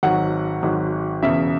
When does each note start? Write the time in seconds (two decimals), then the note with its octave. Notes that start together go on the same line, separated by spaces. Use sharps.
0.03 G#1 G#2 F#3 F#5
0.63 G#1 G#2 F#3
1.23 E1 E2 C#3 E5